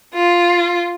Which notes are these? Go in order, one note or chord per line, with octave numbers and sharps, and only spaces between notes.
F4